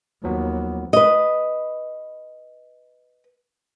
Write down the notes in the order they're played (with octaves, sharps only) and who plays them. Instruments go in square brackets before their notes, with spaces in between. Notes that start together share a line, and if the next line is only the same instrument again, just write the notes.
[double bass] D#2 [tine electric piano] F3 F#3 B3
[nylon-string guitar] B4 D#5